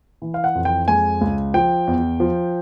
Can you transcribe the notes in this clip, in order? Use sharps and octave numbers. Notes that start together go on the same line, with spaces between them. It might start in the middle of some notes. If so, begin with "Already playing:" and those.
E3
F5
F#5
F2
G5
G#3 G#5
C#2
F3 G5
E2
F3